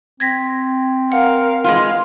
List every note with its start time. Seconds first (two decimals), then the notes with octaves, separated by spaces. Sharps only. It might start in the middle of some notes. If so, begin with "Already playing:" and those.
0.20 C4 G#6 A#6 B6
1.12 A#4 F5 F#5
1.64 G#3 B3 F4 F5